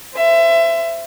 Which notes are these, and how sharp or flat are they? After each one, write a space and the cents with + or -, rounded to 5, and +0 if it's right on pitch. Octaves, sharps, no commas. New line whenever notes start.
C5 -20 E5 +20